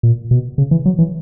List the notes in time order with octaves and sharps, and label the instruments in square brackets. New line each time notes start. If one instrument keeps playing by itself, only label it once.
[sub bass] A#2
B2
C#3
E3
F#3
E3